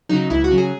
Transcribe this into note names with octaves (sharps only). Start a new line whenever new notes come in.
C#3 F#3 D#4
C#2 E4
F#4
C#3 F#3
G#4